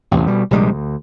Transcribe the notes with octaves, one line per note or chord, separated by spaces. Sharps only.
A1 E2 C3
B2 G3
A#1 C3 G3 G#3
D2